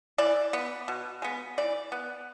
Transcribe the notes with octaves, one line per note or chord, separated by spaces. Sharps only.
E3 D5
B3
B2
G#3 B3
E3 D5
B3